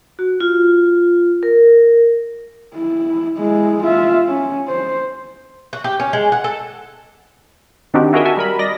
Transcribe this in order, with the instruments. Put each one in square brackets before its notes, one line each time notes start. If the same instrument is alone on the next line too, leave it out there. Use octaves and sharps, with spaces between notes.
[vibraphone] F#4
F4
A#4
[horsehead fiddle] E4
G#3 E4
F4 E5
C#4
C5
[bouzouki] F#4
G4
C#4
G#3
F#5
A4
[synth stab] D#3 C4 D4 D#4 F#4 G4
E4 F#4 G#4 A#4 D#5 E5
F#4 A4 E5 G#5
G3 A#4 B5
D5 D#5 A#6